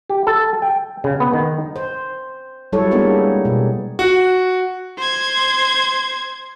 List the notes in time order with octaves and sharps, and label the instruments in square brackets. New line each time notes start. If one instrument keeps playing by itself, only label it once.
[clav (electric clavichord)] G4
A4
G5
C#3
B3
D#3
[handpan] C5
F#3 G3 E4 A4 C#5
G3 G#3 A#3 B3 D4 D#4
B2
[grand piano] F#4
[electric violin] C5 G#6